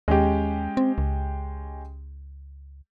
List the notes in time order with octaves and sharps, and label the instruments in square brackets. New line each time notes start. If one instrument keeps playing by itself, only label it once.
[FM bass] D#2 [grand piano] G#3 C#4 G4
[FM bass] C4
C#2